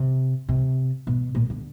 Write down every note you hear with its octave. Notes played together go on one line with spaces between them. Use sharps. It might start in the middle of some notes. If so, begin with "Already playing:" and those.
Already playing: C3
C3
B2
A#2
D3